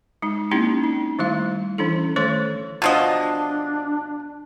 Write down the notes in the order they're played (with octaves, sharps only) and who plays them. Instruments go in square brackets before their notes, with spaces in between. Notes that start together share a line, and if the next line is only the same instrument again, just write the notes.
[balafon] G#3 D#4
A#3 C4 C#4 D#4 E4 G4
D#4
D#3 G3 A3 E4 F5
E3 C#4 D4 E4 A4
D#3 A3 A4 C5 C#5 C6
[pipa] B2 F3 D#5 [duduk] D4